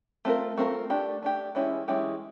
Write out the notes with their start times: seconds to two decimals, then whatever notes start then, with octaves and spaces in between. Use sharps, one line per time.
0.25 A3 C4 F4 A#4
0.58 A3 C4 F4 A#4
0.90 A3 D4 G4
1.22 A3 D4 G4
1.55 E3 G#3 C#4 E4 G4
1.88 E3 G#3 C#4 E4 G4